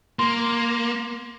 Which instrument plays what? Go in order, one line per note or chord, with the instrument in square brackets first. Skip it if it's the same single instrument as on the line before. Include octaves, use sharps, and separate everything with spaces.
[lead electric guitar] A#3 [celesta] C6